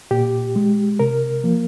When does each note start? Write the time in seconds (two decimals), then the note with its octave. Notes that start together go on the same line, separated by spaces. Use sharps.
0.11 A#2 G4
0.56 G#3
0.99 C3 A#4
1.44 F3 A#3